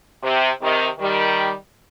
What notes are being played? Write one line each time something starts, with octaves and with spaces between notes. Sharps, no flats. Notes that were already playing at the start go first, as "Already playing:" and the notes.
C3
C3 D#3
D#3 G3